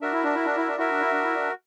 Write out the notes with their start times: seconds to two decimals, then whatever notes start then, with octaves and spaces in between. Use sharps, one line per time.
0.01 D4 F#4 A#4 E5
0.13 E4
0.24 D4
0.35 E4
0.46 D4
0.57 E4
0.68 D4
0.78 E4 F#4 A#4 E5
0.91 D4
1.01 E4
1.12 D4
1.23 E4
1.34 D4